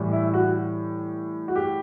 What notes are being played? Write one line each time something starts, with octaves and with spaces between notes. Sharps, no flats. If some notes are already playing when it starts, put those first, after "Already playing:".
Already playing: A2 E3 G3
E4
F#4
F#4
G4